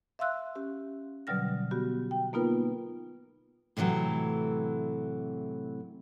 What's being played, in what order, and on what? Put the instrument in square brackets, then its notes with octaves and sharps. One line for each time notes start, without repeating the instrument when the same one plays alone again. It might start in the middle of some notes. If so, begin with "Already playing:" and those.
[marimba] E5 F5 C6 E6 F#6
C#4 G4
B2 D3 F#3 G3 F6 A#6
B3 F#4 G4
G5
A#3 B3 D#4 F4 A#4 B4
[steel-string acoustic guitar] A2 C3 E3 F#3 A3